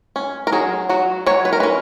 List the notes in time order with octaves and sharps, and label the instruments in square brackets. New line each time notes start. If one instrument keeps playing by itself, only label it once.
[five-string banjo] C#4
A#4
F#3 G#4
F#3 F#4
F#3 C#5
B4
A#4
C#4 B4